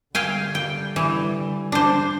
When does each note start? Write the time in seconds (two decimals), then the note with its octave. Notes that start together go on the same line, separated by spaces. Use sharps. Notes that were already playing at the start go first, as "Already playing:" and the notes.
0.15 D3 G3 F5 G5 G#5
0.55 G5
0.96 E3
1.72 D4 C5